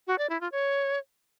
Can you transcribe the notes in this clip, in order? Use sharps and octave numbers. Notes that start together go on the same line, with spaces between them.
F#4
D5
E4
F4
C#5